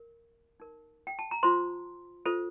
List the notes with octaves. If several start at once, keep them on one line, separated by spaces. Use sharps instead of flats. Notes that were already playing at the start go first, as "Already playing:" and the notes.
Already playing: A#4
D#4 A#4
G5
A5
A#5
F4 C5 C6
F4 A4 C5